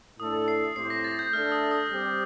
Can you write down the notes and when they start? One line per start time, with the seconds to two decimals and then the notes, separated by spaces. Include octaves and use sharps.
0.19 A2 A3 D4 A4 D#6
0.48 C7
0.76 A2 A3 C4 G4 C5 C7
0.90 A#6
1.04 A6
1.19 G6
1.33 A3 D4 A4 F6
1.52 D#6
1.71 D#6
1.90 G3 C4 G4